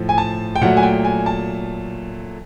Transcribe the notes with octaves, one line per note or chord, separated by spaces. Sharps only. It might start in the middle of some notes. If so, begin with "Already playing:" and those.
Already playing: A2 F3
G#5
A5
G5
A#2 F#3 A3 F#5
G#5
G5
G#5
A5